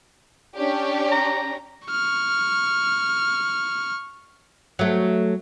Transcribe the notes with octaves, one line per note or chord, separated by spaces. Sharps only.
C#4 D4 G4
A#5
C#6 F6
F#3 A3